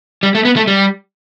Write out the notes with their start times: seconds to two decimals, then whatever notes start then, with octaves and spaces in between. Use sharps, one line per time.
0.23 G3
0.35 A3
0.45 B3
0.56 A3
0.67 G3